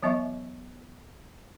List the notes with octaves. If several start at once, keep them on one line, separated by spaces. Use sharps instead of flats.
E3 F#3 B3 D#5 E5 C#6